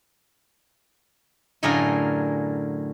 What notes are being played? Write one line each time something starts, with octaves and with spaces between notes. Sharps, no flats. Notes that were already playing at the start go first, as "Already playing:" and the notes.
F#2 A2 D3 G#4 A#4 F5